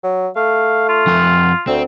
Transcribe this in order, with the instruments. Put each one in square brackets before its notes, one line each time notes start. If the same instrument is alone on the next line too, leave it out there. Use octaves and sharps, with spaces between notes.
[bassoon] F#3
[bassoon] A3 [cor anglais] F5
[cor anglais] F4
[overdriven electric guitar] F2 F#5
[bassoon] D2 [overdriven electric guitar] C4